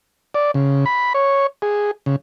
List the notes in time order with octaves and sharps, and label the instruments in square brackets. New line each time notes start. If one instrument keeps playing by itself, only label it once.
[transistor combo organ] D5
C#3
B5
C#5
G#4
C#3